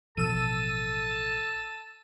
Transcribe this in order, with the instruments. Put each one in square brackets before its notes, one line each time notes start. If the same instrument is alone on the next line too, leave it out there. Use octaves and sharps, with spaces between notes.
[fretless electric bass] A1 B2 F3 [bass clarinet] A4 [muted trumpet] A5 [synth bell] E6 D#7